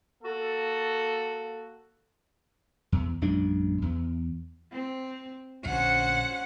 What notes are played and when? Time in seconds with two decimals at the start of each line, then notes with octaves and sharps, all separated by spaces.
0.24 A#3 F#4 A4
2.92 E2
3.22 A#1 F#2 G#3 D4
3.82 E2
4.73 C4
5.65 A#1 D3 C#4 F#4 C5 F#5